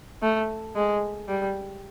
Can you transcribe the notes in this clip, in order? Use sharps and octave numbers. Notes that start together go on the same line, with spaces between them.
A3
G#3
G3